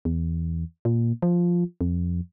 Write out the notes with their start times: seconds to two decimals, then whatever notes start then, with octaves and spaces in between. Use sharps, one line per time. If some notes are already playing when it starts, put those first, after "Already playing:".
0.05 E2
0.85 A#2
1.22 F3
1.81 F2